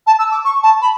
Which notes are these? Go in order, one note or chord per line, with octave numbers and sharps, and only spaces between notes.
A5
E6
D6
C#6
A5
B5